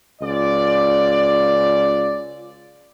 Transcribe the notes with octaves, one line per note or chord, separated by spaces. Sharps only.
C#2 F4 D5